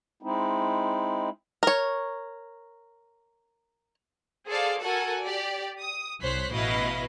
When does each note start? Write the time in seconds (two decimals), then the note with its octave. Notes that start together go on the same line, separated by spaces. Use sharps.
0.23 G#3 C4 D#4 E4
1.63 A#4 C#5
4.48 G#4 A4 C5 D5 F5
4.82 F#4 A4 A#4 F#5 G#5
5.22 G4 D5
5.80 D#6
6.21 C2 C5 C#5 F#6 B6
6.52 A1 B2 E4 B4 D#5 F5